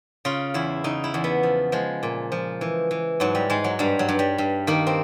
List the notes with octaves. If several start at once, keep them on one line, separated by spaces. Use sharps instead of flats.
C#3 F4
E2 E4
C#3 D#4
E4
E2
B3
F3
F3 G#3
A#2
F3
E3
E3
G#2 F#3
G3
G#2 G#3
F#3
G2 G3
F#3
G2
G3
G2
D#3 A#3
C4